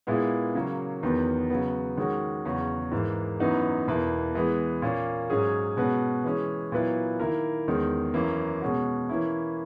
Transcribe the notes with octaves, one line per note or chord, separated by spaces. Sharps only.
A#2 G#3 B3 E4
C#3 F#3 A#3 C#4
E2 D#3 F#3 B3
C#3 F#3 B3
D#3 G#3 C#4 F#4
E2 C#3 F#3 C#4 F#4
G#2 E3 A#3
F#2 E3 B3 D#4 F#4
E2 B2 A#3 E4 B4
E3 G#3 B3
A#2 A#3 C#4
G#2 F#3 C#4 G#4
B2 G#3 C#4 F#4 B4
E3 G#3 C#4
A#2 F#3 B3 E4 B4
D#3 A#3 E4 A#4
E2 D#3 G#3 C#4
F#2 E3 A#3 C#4
B2 G#3 C#4 F#4
E3 A#3 C#4 E4